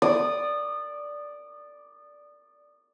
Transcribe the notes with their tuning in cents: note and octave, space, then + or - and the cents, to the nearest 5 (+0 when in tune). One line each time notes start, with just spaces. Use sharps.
D5 +0 D#6 -25